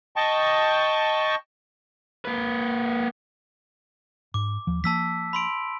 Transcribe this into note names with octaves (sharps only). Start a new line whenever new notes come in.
D#5 G5 A5 C#6
A#3 B4
G#2 D6
D#2 F3
F3 A#3 A5 E6 B6
B5 C6 D7